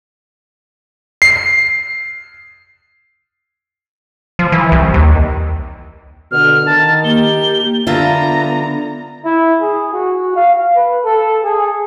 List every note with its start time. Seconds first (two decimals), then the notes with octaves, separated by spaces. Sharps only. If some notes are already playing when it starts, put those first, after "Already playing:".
1.22 C7
4.39 F3
4.52 E3
4.72 C2
4.94 D#2
6.31 B2 D3 F6
6.66 D#3 D#4 A5
7.04 A#3 G4 G7
7.87 D3 B3 F4 E5 A#5
9.25 E4
9.61 G#4
9.93 F#4
10.36 F5
10.76 B4
11.05 A4
11.43 G#4